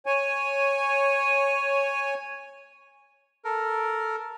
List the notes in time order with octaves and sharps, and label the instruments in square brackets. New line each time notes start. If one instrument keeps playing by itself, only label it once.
[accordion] C#5 G#5
[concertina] A4 A#4